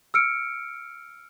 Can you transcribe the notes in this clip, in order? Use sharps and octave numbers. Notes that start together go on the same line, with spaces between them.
E6 F6 C#7 D7